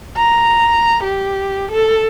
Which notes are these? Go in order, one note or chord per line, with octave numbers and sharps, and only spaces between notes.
A#5
G4
A4